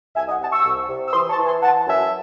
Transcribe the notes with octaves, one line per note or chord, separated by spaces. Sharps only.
C2 E5 G#5
D#5 F#5
C3 F#5 A5
C#6 E6
C2
C3
E6
E3 C6 D#6
A5 C#6
E3
G#5 C6
E3 F#5 A5
F#2 E5 G#5